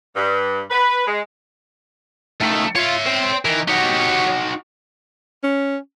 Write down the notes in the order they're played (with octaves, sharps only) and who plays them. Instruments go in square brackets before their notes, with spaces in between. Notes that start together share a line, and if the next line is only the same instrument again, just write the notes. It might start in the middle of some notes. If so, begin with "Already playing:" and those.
[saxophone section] G2
B4
G#3
[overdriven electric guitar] C#2 D#3 [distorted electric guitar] A3
[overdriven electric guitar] F4 [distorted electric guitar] C#5 E5
[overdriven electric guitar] C5 G5
[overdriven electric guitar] D#3 A#4 [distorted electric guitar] E3
[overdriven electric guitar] D#4 F#4 [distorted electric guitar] G4 C#5
[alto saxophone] C#4